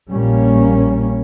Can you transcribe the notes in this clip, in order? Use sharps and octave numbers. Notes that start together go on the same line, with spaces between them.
A#1 A#2 G3 A#3 C#4